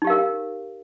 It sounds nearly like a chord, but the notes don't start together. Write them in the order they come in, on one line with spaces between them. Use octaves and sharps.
D#4 G4 F5 A#4